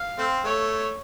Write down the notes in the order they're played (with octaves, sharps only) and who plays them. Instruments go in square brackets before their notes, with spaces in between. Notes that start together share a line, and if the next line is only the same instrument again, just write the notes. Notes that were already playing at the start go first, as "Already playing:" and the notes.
Already playing: [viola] F5
[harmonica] A3 C4
[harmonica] A3 [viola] C#5